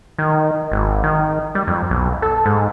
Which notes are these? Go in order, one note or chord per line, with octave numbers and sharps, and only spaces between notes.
D#3
G#1
D#3
G3
F2
B1
A4
G#2